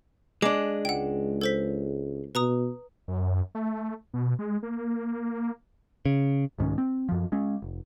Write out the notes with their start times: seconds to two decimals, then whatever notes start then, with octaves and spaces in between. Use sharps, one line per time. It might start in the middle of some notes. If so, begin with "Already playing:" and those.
0.42 G#3 D4 D6
0.85 C#2 F#5 G5
1.41 A4 C5 B6
2.35 B2 B4 A#5 D#6
3.08 F#2
3.55 A3
4.14 B2
4.39 G#3
4.63 A#3
6.06 C#3
6.59 C2 G#2 D#3 C#4
6.78 C4
7.09 F#2 F3
7.32 G#3 C#4
7.62 F1